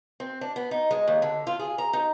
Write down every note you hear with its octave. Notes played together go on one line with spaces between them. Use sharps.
C4
D4
B3
D#4
G#3
D#2
D3
F4
G#4
A#5
D#4